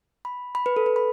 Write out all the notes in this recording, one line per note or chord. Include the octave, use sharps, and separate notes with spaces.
B5
B5
B4
A4
B4
B5